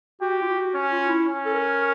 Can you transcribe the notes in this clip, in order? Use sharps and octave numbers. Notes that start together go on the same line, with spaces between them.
F#4 G4
F4
F#4
C#4
F4
E4
C#4
A4
A#4